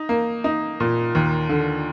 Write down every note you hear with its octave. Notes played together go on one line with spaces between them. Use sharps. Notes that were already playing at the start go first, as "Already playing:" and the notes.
Already playing: D#4
A#3
D#4
A#2
D#2
D3